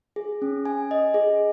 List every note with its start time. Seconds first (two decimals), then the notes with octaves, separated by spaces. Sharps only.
0.16 G#4
0.42 C#4
0.66 G#5
0.91 D#5
1.14 G#4